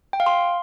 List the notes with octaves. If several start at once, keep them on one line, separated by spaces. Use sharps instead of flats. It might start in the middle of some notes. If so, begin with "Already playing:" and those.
G5
F5
C6